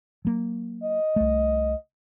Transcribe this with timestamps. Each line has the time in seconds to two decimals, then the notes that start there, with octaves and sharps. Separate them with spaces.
0.25 F#3 A#3
0.83 D#5
1.16 C2 A3